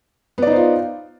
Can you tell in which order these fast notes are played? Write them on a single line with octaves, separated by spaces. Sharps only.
B3 D5 D#4 C5 F4